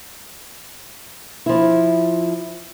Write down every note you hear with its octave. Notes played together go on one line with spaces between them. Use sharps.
F3 E4